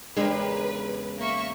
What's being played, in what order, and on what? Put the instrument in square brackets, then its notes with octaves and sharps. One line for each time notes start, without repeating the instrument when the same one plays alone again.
[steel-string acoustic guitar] E2 C#3 G#3 [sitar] D4 G4 A#4 [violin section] B4
[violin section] A#3 E5 C#6